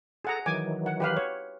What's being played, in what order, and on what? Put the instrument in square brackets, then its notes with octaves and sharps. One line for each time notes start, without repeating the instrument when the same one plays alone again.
[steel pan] G#4 F#5 A#5 [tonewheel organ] A4
[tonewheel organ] D#3 E3 F#3 [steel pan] G#5 D6
[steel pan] F#5
G4 B4 F5
C#5